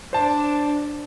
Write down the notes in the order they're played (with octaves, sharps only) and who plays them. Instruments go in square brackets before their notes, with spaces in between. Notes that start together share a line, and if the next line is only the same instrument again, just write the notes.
[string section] D4 [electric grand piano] C5 A5